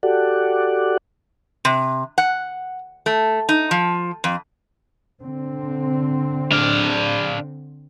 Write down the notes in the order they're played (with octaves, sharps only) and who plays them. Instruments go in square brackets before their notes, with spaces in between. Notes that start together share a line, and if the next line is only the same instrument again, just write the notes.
[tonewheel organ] F#4 G4 A4 D5 F#5
[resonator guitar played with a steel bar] C3
F#5
A3
D#4
F3
F2
[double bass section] D3 C4
[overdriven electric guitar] D4 F5